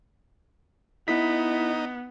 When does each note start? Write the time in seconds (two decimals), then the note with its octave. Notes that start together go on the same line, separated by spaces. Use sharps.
1.08 B3 D#4 E4 B6